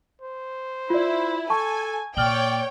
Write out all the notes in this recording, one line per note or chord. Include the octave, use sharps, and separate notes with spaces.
C5
E4 F4 D5
A4 G#5 A5 C#6
A#2 C#5 D5 G5 F6 F#7 G7